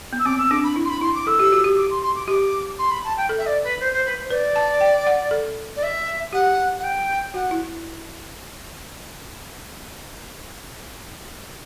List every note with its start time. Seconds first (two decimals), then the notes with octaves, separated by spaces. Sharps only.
0.13 B3
0.19 E6
0.25 C4 D6
0.38 E6
0.51 D4 D6
0.63 B5
0.76 E4
0.85 C6
0.89 B5
1.02 E4 C6
1.15 D6
1.27 A4 E6
1.39 G4
1.52 F#4
1.64 G4
1.77 D6
1.90 C6
2.02 C6
2.15 D6
2.28 G4 D6
2.78 C6
2.91 B5
3.04 A5
3.17 G5
3.29 A4
3.37 E5
3.46 D5
3.63 B4
3.79 C5
3.92 C5
4.05 B4
4.18 C5
4.30 B4 D5
4.56 A5
4.81 G5
5.07 F#5
5.31 A4
5.76 D5
5.83 E5
6.33 G4 F#5
6.78 F#5
6.83 G5
7.34 F#4 F#5
7.51 E4